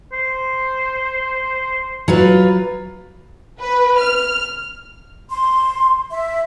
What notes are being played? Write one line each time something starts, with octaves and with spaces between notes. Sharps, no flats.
C5
F#3 F4 B4
B4
F6
C6
E5